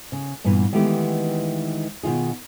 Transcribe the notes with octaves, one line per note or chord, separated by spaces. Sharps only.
C#3
G2 A#2 E3 B3
D#3 E3 G#3 A3 B3 G4
B2 D#3 F4 G#4